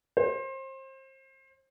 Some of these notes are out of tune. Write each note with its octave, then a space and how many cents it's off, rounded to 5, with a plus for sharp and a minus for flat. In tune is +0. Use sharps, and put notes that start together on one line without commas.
C5 +30